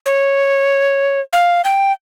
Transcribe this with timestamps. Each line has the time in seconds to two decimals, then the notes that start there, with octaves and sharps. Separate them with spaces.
0.06 C#5
1.33 F5
1.65 G5